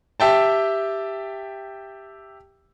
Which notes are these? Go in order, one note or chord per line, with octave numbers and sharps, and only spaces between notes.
G4 E5 G5 A5